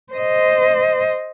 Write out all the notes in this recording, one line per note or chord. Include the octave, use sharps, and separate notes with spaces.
C5 D#5